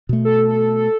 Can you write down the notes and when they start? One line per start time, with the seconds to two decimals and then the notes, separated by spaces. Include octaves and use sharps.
0.09 B2 A3
0.25 A4